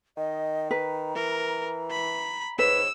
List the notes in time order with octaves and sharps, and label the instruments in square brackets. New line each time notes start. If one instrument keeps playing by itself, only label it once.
[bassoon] D#3 [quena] D#5
[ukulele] B4 [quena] A#5
[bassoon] E3 [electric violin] A#4
[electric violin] B5
[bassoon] G#2 [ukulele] B4 [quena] C#5 [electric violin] E6